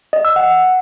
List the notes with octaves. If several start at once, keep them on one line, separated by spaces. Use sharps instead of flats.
D#5
E6
F#5